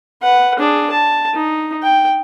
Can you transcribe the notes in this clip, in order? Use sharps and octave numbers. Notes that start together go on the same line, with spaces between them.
B4 F#5
D4 G#4
A5
D#4
G5